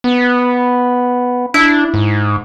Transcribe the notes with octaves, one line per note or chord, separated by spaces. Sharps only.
B3
D4 E4
G#2